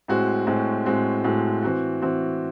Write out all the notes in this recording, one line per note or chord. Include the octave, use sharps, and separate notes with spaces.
A2 G#3 C4 F#4
A2 G#3 C4 F#4
A2 G#3 C4 F#4
A2 G#3 C4 F#4
E3 C4 F#4
E3 C4 F#4